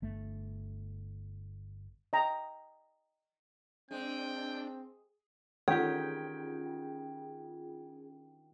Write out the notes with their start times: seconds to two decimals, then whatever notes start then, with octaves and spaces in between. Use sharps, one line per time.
0.02 G1 A3
2.13 D#5 G5 A#5
3.91 G#3 C4 D4 G5
5.68 D#3 C#4 F4 G4 G#4 G5